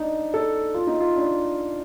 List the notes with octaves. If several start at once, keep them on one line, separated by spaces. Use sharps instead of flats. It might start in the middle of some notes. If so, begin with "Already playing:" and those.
Already playing: D4 D#4
A4
F4
D#4
F4
D4